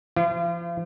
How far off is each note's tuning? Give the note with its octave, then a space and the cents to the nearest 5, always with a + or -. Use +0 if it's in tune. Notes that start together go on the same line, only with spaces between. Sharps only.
F3 -35 F4 -45